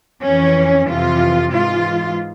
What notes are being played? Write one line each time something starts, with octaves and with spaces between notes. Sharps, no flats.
F2 E3 C#4
F2 C3 E3 F4
G#2 E3 F4